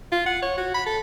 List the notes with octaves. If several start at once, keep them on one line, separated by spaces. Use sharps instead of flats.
F4
F#5
C#5
F#4
B5
A4